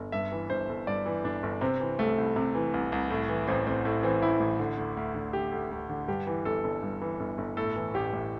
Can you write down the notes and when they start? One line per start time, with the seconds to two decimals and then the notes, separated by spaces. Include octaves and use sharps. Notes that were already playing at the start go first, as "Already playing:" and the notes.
Already playing: G1
0.12 G2 E5
0.32 E3
0.50 G1 C5
0.69 G1
0.87 G2 D5
1.06 E3
1.24 G1 D4
1.43 G1
1.61 C3 C4
1.80 E3
1.99 C2 A3
2.18 C2
2.36 C3
2.55 E3
2.74 C2
2.92 C2
3.10 A2
3.29 E3
3.47 A1 C4
3.66 A1 C4
3.85 A2
4.03 E3 C4
4.22 A1 E4
4.40 A1
4.59 D3
4.78 D2
4.97 D2
5.15 D3
5.33 D3 G4
5.52 D2
5.71 D2
5.89 D3
6.08 G2 G4
6.27 E3
6.45 G1 A4
6.64 G1
6.83 G2
7.02 E3
7.20 G1
7.38 G1
7.57 A2 A4
7.76 E3
7.94 A1 G4
8.13 A1